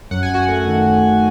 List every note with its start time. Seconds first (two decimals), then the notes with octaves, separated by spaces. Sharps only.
0.11 F#2 F#5
0.23 G#5
0.29 F#2
0.34 F#4 F#5
0.49 A3
0.67 D#3
0.86 F#2